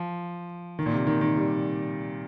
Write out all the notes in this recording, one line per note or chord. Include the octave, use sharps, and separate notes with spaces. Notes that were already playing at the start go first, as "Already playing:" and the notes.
Already playing: F3
D#3
A#2
C3
D#3
D#3
G3